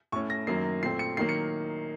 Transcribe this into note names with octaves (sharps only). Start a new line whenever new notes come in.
A2 A3 C#4 C#6
A#6
F#2 D#3 F#3 A#3 C7
A#2 A3 C4 C7
C#7
D#3 F#3 A#3 C7
C#7